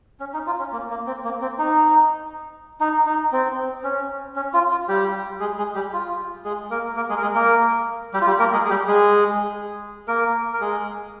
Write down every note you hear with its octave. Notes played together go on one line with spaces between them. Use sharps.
C#4
D#4
F4
C#4
A#3
A#3
C4
A#3
C4
D#4
D#4
D#4
C4
C#4
C#4
F4
F4
G3 G4
G#3 G#4
G#3 G#4
G3 G4
F4
G#3 G#4
A#3 A#4
A#3 A#4
G#3 G#4
A#4
G#3 G#4
A#3 A#4
G3 G4
F4
G3 G4
A#3 A#4
G#3 G#4
G#4
G3 G4
G#3 G#4
A#3 A#4
A#4
G#3 G#4